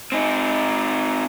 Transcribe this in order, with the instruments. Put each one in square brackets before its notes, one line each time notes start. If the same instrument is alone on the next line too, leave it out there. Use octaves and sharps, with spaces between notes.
[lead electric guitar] C4 D#4